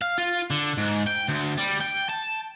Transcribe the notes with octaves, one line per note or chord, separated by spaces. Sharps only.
F5
F4
D3
G#2
G5
D2
G3
G5
A5